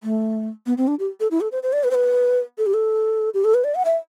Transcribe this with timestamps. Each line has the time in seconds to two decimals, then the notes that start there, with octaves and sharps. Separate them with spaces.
0.03 A3
0.66 B3
0.78 C4
0.88 D4
0.99 G4
1.20 A4
1.31 E4
1.41 A4
1.52 C5
1.63 C5
1.73 D5
1.84 B4
1.91 C5
1.95 B4
2.58 A4
2.66 G4
2.74 A4
3.34 G4
3.44 A4
3.54 B4
3.64 D5
3.75 F#5
3.85 E5